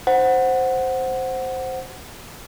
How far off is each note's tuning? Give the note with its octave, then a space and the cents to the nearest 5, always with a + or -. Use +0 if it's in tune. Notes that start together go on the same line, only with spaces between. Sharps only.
C5 +0 F#5 +0